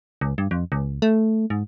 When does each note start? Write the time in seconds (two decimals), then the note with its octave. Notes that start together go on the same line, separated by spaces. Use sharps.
0.21 C#2
0.38 G2
0.51 F2
0.72 C#2
1.02 A3
1.50 G#2